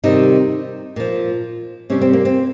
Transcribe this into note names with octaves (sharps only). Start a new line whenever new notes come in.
C3 D#3 G3 D#4
A#2 F3
C3 G3 C#4
C4
A#3
C4